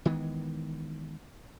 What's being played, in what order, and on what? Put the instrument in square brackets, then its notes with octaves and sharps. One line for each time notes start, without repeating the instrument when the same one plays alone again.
[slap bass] D#3 E3 G#3 B3